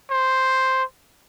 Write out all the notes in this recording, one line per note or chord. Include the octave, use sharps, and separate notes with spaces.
C5